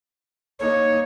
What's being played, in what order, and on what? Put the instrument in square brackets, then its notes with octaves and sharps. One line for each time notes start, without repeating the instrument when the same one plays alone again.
[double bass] A#3 D#4 [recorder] C#5